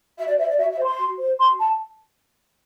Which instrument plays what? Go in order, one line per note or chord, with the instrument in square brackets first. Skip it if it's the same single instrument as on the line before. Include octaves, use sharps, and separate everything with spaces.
[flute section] F#4 E5
D5
C5 E5
D5
F#4 E5
E5
C5
C6
F#4
C5
F#4 C6
A5